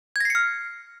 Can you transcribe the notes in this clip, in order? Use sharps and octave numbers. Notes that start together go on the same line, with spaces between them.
F6 G#6 A#6 C7 C#7